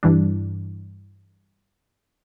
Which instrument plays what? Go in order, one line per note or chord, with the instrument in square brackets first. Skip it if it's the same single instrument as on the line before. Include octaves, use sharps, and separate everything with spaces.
[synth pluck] G2 E3 G3 D4